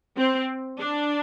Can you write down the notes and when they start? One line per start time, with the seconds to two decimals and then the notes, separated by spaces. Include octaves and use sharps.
0.16 C4
0.80 D4